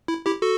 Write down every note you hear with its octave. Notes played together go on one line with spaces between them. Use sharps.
E4
E4 G4
F#4 A4